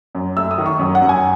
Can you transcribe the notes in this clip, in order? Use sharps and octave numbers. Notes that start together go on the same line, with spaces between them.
F#2
A3 E6
D#6
D#3
C#6
F#2
F#5
F#2
G#5